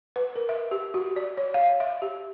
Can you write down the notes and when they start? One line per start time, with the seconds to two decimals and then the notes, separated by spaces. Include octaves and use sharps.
0.16 B4
0.36 A#4
0.49 E5
0.71 G4
0.94 F#4
1.16 D5
1.37 C#5
1.54 F5
1.80 E5
2.02 G4